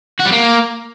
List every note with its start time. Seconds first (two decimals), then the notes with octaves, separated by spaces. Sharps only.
0.19 F#4
0.26 G3
0.32 A#3